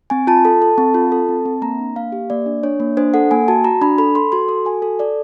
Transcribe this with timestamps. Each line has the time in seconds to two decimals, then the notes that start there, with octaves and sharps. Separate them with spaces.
0.10 C4 G#5
0.27 F4 A5
0.45 A4
0.62 A4
0.78 C4
0.94 F4
1.12 A4
1.29 C4
1.45 C4
1.62 A#3 A#5
1.79 D4
1.95 A#3 F5
2.12 G4
2.30 A#3 D5
2.46 D4
2.63 D4 C#5
2.80 A#3
2.97 D4 C5
3.14 A4 F#5
3.31 A#3 G#5
3.48 F#4 A5
3.64 F#4 A#5
3.82 D4 B5
3.98 A4 B5
4.15 A4 C6
4.32 F#4 C6
4.49 A4
4.65 F#4 G#5
4.82 A4
4.99 A4 D5